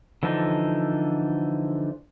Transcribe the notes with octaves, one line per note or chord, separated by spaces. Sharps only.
D3 E3 F3 D4 D#4